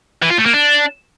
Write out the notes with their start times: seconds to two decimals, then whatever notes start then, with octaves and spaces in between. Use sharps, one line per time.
0.22 E3
0.30 F4
0.38 A3
0.46 A#3
0.54 D4